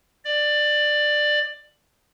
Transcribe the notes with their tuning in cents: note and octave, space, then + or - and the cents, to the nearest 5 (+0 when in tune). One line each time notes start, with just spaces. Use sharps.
D5 +15